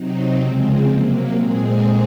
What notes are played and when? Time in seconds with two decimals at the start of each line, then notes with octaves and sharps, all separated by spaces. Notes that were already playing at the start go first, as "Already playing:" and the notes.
Already playing: C3 F#3 C4 D#4
0.40 C#3 F3 G#3 C4
0.88 C3 F#3 A#3
1.34 A#2 G#3 C4 G#4